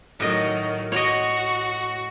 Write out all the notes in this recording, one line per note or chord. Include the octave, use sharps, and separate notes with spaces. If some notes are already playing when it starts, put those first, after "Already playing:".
A2 D#3 F#3 D#5
F#4 C#5 D#5